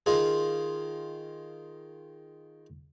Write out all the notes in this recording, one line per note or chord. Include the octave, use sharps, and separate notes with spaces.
D#3 F4 G#4